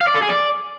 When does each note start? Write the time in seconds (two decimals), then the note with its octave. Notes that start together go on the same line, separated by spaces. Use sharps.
0.01 F5
0.08 D5
0.15 A4
0.23 G#4
0.30 D5